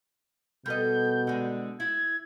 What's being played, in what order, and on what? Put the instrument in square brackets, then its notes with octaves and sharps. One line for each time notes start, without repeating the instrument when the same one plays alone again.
[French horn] B2 [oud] G3 A4 D#5 [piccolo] G6
[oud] D3 G#3
[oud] E4 [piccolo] G#6